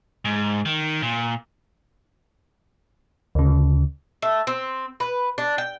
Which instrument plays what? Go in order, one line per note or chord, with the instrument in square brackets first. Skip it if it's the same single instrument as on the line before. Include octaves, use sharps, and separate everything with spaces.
[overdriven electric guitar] G#2
D#3
A#2
[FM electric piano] D2 C#3
[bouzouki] A3
C4
B4
D4
G5